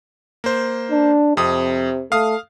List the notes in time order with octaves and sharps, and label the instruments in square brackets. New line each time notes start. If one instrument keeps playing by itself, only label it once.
[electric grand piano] A#3 C5
[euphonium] D4
[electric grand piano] F2 D#6 [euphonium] C3
[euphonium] A3 [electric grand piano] F5 D#6